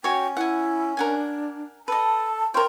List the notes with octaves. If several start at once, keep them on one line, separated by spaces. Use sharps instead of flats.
C#4 F#4 C#5 G5
E4 F#5 G#5
D4 A#4 F#5 G#5
A4 B4 D#5 A5
F4 A#4 C5 C#5 G5 C6